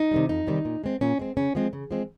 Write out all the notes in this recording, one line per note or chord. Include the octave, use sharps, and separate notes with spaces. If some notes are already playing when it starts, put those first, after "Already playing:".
Already playing: D#4
C3 D#3 G3
F2 D#4
C3 D#3 G3
A#2
G#3 C4
A#2 C#4
G#3 C4
C#3 C#4
F3 G#3 C4
C#3
F3 G#3 C4